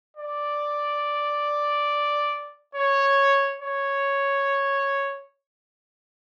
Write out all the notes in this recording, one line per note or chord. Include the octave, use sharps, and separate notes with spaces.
D5
C#5
C#5